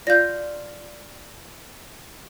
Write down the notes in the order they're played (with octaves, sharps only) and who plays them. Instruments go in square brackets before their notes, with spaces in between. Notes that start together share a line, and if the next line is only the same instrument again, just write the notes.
[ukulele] F4 F5 [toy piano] D5 [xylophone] G6 A#6